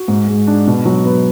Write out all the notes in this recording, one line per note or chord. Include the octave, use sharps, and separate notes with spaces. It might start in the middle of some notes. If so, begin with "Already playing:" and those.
Already playing: F#4
G#2
G#3
D4
B2
F#3
B3